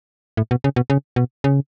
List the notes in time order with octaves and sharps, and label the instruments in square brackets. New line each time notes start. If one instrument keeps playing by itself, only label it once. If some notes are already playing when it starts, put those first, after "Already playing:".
[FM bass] A2
B2
C#3
B2
C#3
B2
C#3